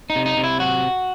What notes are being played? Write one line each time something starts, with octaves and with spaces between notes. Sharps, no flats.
D#4
C3
D#4
C3
E4
F#3 F#4